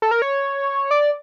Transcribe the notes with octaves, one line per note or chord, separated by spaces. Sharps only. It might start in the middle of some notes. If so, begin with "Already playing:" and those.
A4
A#4
C#5
D5